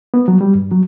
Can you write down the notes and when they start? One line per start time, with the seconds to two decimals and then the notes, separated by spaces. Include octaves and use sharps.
0.14 B3
0.28 F#3
0.41 G3
0.55 G2
0.72 F#3